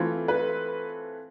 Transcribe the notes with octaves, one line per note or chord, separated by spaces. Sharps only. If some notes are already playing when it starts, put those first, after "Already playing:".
Already playing: E3 A3 C4 F4
B4